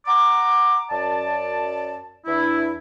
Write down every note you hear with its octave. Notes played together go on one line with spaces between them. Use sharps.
F#5 A#5 D6
F#2 D5 A5
E2 D4 E4